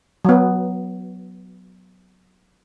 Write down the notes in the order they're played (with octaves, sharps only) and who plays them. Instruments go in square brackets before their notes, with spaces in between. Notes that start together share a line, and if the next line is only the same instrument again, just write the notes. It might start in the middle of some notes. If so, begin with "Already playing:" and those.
[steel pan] F#3 B3